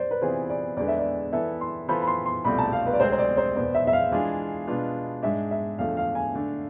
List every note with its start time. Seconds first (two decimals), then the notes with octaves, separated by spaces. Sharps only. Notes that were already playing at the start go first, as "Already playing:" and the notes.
Already playing: C5 D5
0.11 B4
0.21 C3 E3 B3 F4 G#4 C5
0.50 D5
0.77 E2 D3 G#3 B3 D5
0.88 E5
0.99 D5
1.33 E3 B3 E4 A4 E5
1.61 C6
1.88 E3 B3 F4 A4 C5 B5
2.02 B5
2.07 C6
2.26 C6
2.45 C2 B2 A3 C4 F4 B5
2.59 A5
2.73 F5
2.87 B4
2.93 D5
3.00 D2 C3 G#3 C4 G#4 C5
3.12 C5
3.19 D5
3.37 C5
3.56 E2 B2 B3 D5
3.75 E5
3.87 E5
3.93 F5
4.12 E3 G#3 D4 F4 G#4
4.67 B2 G#3 D4 F4 B4
5.23 G#2 G#3 D4 E5
5.51 E5
5.79 E2 D3 F3 A3 F5
5.97 F5
6.15 G#5
6.34 D3 A3 D4